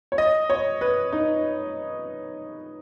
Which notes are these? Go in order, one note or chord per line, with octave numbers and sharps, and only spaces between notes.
C#5
D#5
C#5
B4
D#4